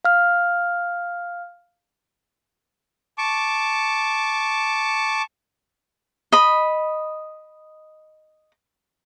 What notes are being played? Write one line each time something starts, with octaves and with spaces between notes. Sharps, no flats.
F5 F6
A5 C#6 D6
D#5 B5